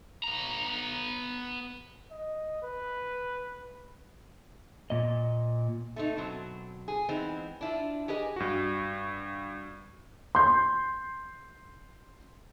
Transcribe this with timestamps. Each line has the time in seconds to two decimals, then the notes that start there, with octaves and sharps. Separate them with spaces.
0.24 B3 A#5
2.11 D#5
2.63 B4
4.90 A#2 D#5
5.96 A3 C4 D#4
6.17 B2 F#3 C4
6.88 G#4
7.09 E3 G#3 B3 C4 D#4
7.61 D4 E4 F4
8.08 G4 G#4 B4 D#5 G#5
8.36 G2 F#4
10.35 C6 G6